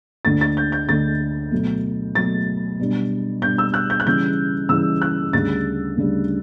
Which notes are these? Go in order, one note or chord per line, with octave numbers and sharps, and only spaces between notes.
D2 D3 A3 A6
A6
G6
G6
D2 D3 A3 A6
B2 F#3 A3
B2 F#3 A3 A6
B2 G3 D4
B2 G3 D4 G6
E6
F#6
G6
F#6
C#3 E3 G3 C#4 G6
C#3 E3 G3 C#4 E6
F#6
D2 C#3 G3 D4 A6
D2 C#3 G3 D4